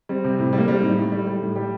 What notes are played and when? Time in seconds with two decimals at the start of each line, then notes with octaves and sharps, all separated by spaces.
0.09 G3 C4
0.24 C3
0.39 A2
0.53 G3
0.58 A#3
0.68 G3 C4
0.82 A2 D#4
0.97 A2
1.12 G3
1.27 G3
1.42 A2
1.56 G3 G4